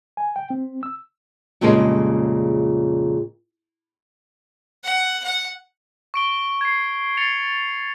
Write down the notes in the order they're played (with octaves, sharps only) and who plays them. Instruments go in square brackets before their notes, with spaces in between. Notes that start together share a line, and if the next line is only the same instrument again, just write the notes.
[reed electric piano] G#5
G5
C4
E6
[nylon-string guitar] F2 A#2 C#3 G3 G#3 C#4
[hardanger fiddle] F#5
F#5
[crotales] C#6 D7 G7
G#6 C7
A6 C7 C#7 F7